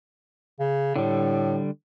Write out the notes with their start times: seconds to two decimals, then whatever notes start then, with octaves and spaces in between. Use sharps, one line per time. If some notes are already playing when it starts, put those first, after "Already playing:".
0.60 C#3
0.96 A2 D3 G3